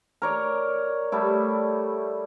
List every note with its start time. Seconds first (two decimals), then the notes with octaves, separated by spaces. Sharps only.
0.22 A#4 C#5 D5
1.12 G3 A3 E4